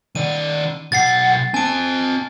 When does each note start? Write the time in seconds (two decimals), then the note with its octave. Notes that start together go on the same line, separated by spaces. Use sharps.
0.15 D#3 D5 D#7
0.92 B1 F#5 A6 C7
1.54 C4 G#5 A5 D7